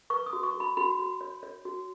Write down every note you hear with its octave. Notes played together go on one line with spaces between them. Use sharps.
B4 C#6
D#6
F#4
C#6
F#4
B5
F#4 B5
F#4
C#5
C#5
F#4